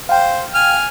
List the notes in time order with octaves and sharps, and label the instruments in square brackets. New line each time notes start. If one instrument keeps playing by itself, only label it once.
[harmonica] C5 [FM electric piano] F5 G5
[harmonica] G#5 F6